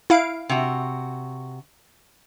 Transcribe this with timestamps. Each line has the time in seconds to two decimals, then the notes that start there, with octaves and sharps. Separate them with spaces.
0.10 E4 F5 D7
0.49 C3 F#4